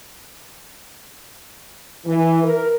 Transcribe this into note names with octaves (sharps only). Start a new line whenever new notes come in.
E3
A#4